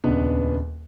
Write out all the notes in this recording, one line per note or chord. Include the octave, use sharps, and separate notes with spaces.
D#1 C#2 B3 D4 B4